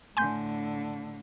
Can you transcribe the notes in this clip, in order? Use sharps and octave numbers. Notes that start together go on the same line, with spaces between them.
A2 D3 G#5 C6 G6